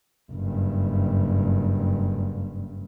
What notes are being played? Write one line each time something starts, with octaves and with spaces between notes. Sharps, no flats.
F#1 G2